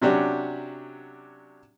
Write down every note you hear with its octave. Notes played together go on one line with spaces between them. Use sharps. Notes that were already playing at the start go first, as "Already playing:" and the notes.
C3 F#3 C#4 D4 F#4 G4